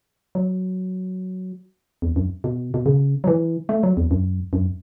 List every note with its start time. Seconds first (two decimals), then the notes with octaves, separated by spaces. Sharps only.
0.35 F#3
2.02 E2
2.16 F#2
2.44 B2
2.74 B2
2.86 C#3
3.24 F#3
3.27 E3
3.69 A3
3.83 F#3
3.97 E2
4.11 F#2
4.53 F#2